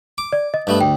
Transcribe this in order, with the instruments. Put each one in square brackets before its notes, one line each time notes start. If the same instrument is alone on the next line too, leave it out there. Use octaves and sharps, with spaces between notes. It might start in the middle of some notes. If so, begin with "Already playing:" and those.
[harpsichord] D6
[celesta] D5
D#5
[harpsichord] G2 A3 B3
[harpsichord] D2 [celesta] G5